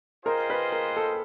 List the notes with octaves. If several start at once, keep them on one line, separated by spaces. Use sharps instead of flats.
F4 G#4 A#4 C5 D#5 G5
B4
A#4
A4